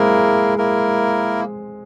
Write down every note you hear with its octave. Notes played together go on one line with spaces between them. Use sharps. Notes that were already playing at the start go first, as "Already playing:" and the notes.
Already playing: G#3 A#3 C4 E4 G#4 A#4
A#3 E4 A#4